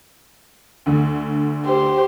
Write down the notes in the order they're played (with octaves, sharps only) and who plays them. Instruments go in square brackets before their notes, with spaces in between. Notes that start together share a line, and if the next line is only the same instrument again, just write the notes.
[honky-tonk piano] D2 D3
[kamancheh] G4 C5